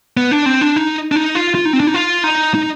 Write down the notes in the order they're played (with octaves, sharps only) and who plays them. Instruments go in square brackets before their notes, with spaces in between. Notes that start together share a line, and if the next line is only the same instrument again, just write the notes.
[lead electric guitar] B3
D4
C4
D4
D#4
D4
D#4
F4
F4
D#4
C4
D4
D#4
F4
D#4
D#4